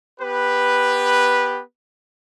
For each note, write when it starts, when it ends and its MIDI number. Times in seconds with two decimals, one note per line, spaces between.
0.21 1.61 59
0.21 1.61 67
0.21 1.61 71